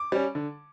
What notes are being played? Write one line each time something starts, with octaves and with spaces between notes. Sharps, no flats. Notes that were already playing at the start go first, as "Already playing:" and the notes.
Already playing: D6
G3 C#4
D3